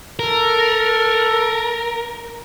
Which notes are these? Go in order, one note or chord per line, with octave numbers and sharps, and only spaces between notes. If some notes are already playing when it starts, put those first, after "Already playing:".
A4 A#4